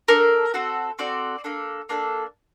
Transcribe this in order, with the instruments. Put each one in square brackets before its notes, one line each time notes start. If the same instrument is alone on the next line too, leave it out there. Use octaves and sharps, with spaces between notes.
[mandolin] D4 A4 A#4
C4 F#4 A4
C4 F#4 A4 D5
A#3 D4 A4
A#3 D4 A4